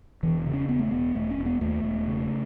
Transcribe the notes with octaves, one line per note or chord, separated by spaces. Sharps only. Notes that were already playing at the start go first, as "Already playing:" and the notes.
E1 E3
C#3
C#4
E1 B3
A3
E1 B3
E1 A3
C#4
E1
B3
D#2 A3
E1
C#3